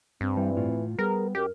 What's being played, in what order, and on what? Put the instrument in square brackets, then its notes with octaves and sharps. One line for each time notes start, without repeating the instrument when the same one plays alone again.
[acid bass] G2 [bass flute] C4
[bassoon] E3 [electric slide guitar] G3
[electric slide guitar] A2 F4
[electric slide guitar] G3 [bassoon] B3 [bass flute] G#4 [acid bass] A#4
[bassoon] F#2 [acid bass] G4 [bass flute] A#4